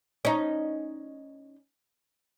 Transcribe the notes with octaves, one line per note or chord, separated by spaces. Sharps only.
C#4 D#4